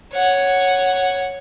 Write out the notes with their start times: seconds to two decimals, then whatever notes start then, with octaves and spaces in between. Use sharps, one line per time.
0.13 C#5 F#5